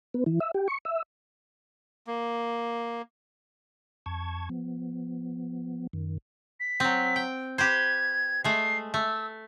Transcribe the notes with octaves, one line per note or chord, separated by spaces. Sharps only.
B3
E3
E5
G4
C#6
E5
A#3
F2 A5 C#6 G#6
F3 B3
F#2 D#3
B6
F#3 C4
G5
G4 B4 C5 G#6
G#3 A3 C7
A3 E6